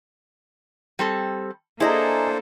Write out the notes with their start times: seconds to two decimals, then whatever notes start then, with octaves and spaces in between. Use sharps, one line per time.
0.99 G3 C4 A4
1.80 A#3 D4 E4 G#4 A4 C5 D#5 A#5